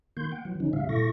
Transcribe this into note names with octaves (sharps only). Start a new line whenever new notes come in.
D#3 A#3 C6 G6
F#5 G5
E3 F#3
D3 F3 C#4 D#4
A2 C#3 G3 E5 F5
A#2 E4 A4 C#6 A#6